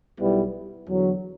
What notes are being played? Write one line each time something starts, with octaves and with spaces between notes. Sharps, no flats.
B1 B2 G3 B3 E4
E2 D3 F#3